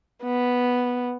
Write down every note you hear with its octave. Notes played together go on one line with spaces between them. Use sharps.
B3